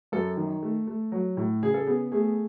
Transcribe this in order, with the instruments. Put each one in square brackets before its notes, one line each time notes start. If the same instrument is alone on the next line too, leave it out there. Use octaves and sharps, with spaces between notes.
[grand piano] F#2 A4
D#3
A3
A3
F#3
A2
C#3 G#4
A4
B3 G#4
A3 G#4